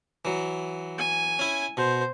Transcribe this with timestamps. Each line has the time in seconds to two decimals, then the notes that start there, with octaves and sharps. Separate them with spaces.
0.25 E3 F#3
0.98 G#5
1.39 C#4 E4
1.77 B2 C5